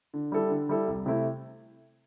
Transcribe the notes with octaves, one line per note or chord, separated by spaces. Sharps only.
D3
G3 E4 A4
D3
G3 E4 A4
C2
C3 A3 E4